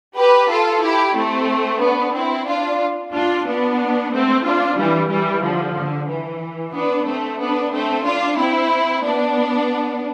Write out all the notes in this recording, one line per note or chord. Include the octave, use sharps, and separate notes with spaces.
G4 B4
F4 A4
E4 G4
A3 C4
B3 D4
C4 E4
D4 F4
D4 F4
B3 D4
A3 C4
D4 F4
E3 G3
E3 G3
D3 F3
D3
E3
B3 D4
A3 C4
B3 D4
A3 C4
D4 F4
C4 E4
B3 D4